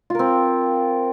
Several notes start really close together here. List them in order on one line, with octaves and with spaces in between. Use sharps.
F4 A#4 C4